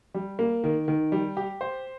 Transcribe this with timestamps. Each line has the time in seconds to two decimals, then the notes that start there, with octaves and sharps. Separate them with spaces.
0.14 G3
0.39 A#3
0.64 D#3
0.88 D#3
1.12 G3
1.37 G4
1.61 C5